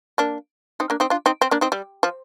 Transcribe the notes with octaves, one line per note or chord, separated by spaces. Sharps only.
A#3 D4
C4 D#4
A#3 D4
C4 D#4
D4 F4
C4 D#4
C4
A#3 D4
C4 D#4
G3
F3